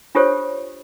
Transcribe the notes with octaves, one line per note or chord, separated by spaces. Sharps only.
D4 F4 G4 A4 C5 C#5